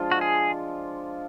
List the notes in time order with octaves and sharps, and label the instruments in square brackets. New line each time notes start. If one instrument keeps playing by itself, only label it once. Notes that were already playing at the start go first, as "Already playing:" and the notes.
Already playing: [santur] F3 G#3 D4 F4
[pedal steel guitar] F#4
G#4